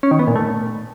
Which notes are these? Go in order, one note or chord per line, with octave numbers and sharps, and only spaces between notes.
C#4
D#3
B3
A#2
A3